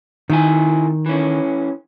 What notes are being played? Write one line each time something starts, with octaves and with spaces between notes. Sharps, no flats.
C3 D#3 E4 G#5
E3 C#4